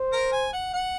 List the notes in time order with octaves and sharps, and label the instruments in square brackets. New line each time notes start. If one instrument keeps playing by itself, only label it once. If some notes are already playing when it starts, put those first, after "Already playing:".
Already playing: [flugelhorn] C5
[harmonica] A#4
G#5
F#5
F#5